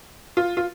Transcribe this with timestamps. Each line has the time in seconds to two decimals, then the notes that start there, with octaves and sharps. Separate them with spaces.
0.37 F4
0.57 F4